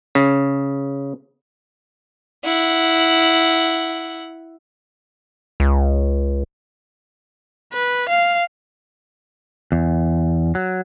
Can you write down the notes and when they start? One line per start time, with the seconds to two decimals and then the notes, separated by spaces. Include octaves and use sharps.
0.15 C#3
2.44 E4 F#5
5.60 C#2
7.73 B4
8.09 F5
9.72 E2
10.55 F#3